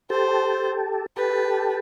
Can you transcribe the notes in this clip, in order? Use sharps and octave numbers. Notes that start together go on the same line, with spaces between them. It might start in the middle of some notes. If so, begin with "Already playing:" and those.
G4 A4 C5
G4 A4 B4